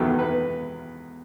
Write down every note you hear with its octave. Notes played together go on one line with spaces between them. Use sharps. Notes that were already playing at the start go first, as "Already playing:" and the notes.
Already playing: E2 D#3 F#3 B3 A4
B4